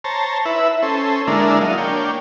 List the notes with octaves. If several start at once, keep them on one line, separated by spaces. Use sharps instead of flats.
C5 C#5 A5 A#5
E4 B4 E5
C#4 A4 C5
D3 G#3 A#3 D4 E4 A#4
F#3 D#5 F5
A#3 D4 C#5 G5